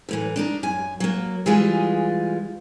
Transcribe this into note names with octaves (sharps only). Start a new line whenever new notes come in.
F#2 A2 E3
D4 D#4 A#4
F#2 G#5
F#3 A#3
E3 G3 G#3 F4 G#4